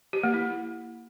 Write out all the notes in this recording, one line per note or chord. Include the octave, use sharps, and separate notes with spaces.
G4
A#3
E4